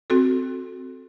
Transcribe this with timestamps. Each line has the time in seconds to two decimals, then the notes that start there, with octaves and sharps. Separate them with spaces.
0.10 C4 F#4 A4